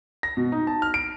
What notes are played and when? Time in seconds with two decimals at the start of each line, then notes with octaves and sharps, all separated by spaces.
0.23 A#6
0.37 B2
0.52 D#4
0.67 A5
0.82 F6
0.94 D7